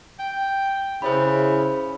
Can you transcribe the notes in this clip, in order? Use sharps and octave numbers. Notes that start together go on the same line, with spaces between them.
G5
C#3 E4 C5 C#5 B5